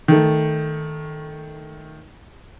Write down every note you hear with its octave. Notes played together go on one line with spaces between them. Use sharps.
D#3 A3